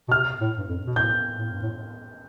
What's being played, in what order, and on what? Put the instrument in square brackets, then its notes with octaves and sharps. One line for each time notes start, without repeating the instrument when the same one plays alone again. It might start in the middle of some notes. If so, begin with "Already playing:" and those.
[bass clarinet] B2
[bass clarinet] C3 [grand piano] F6
[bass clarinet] A2
G2
F2
B2
[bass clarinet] A2 [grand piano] G6
[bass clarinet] A2
G2
A2